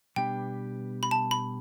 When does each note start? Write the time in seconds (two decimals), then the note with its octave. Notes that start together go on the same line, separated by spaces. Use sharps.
0.16 B2 G3 B3 D4 G4 G5
1.03 B5
1.11 A5
1.31 B5